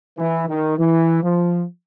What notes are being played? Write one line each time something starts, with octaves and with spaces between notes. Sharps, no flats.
E3
D#3
E3
F3